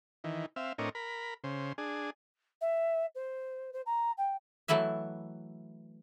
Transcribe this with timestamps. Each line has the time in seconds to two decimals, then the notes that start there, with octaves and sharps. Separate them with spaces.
0.24 D#3 E3
0.56 C4 E5 F5
0.78 A2 C4 D4 A#4 C#5 D#5
0.95 A#4 B5
1.44 C#3 C5
1.78 D4 G#4
2.61 E5
3.15 C5
3.73 C5
3.86 A#5
4.18 G5
4.68 E3 F#3 A3 E4 B4 E5